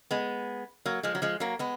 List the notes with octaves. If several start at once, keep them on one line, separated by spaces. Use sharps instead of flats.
G#3 B3
F#3 A#3
F3 G#3
F#3
F3 G#3
F#3 A#3
G#3 B3